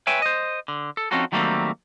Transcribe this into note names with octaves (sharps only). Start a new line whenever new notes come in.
B4 C#5 E5 G5 G#5
C5 D#5
D3
A4
F3 C4 C#4 D#4 F#4 A4
D#3 F#3 G3 A3 A#3 C4